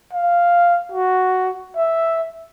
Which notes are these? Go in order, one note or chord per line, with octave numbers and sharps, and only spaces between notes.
F5
F#4
E5